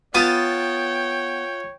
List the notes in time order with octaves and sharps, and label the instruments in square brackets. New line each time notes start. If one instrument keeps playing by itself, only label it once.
[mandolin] B3 [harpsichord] F4 A5 [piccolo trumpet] C#5 [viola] G5